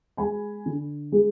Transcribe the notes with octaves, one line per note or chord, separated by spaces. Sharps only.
G#3 G#5 B5
D3
G#3